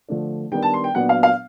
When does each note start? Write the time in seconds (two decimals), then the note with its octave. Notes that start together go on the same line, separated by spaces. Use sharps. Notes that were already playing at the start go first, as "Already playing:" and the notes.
0.09 D3 F3 A3 D4
0.52 D#3 G3 B3 D4 G5
0.62 A5
0.74 C6
0.84 G5
0.95 A#2 F#3 B3 D4 F#5
1.09 F5
1.23 F5